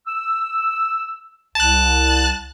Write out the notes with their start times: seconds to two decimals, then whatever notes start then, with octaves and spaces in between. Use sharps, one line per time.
0.07 E6
1.55 C2 A5 F#6